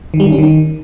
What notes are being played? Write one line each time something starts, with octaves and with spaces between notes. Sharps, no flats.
D#3
G3
D#3
C#4
D#3